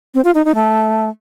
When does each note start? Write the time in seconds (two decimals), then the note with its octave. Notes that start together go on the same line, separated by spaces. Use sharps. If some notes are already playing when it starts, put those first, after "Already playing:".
0.14 C4
0.25 F4
0.35 D#4
0.45 D#4
0.55 A3